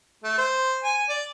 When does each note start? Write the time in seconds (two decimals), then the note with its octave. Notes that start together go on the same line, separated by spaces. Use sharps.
0.24 A3
0.38 C5
0.84 G#5
1.10 D5